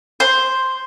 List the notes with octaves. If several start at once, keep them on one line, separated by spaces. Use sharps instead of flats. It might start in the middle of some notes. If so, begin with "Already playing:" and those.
C5